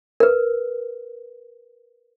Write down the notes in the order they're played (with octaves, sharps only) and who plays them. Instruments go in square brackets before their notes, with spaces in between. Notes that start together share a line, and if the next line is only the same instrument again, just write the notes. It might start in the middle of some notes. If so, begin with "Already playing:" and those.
[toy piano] A#4 B4